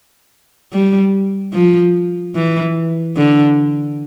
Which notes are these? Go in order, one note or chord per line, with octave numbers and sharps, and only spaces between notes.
G3
F3
E3
D3